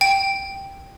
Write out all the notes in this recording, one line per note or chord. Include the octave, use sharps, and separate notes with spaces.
G5